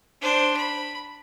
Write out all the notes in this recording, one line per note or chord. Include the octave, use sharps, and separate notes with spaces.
D4 C5
B5